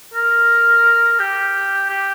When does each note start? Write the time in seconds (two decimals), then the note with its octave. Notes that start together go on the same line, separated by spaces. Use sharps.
0.14 A#4
1.19 G4
1.90 G4